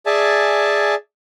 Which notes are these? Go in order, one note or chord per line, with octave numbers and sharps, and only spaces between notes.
G#4 D5 E5 G#5 A5